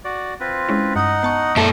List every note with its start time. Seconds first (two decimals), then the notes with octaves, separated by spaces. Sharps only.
0.05 F#4 D5
0.40 C4 F4 B4
0.69 G#3 C#4 E4
0.96 G2 D#4 D#5 F#5 D#6
1.23 B3 A5 C#6
1.56 F#2 A#2 A4 D5 E5 C#7